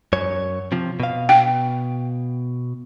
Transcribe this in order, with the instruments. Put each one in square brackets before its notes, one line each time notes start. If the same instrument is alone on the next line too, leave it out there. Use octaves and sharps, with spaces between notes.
[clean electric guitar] F#2 C#5
C3 F3
B2 F5
[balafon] G5